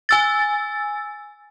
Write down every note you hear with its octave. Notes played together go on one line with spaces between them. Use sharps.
G#5 E6 A6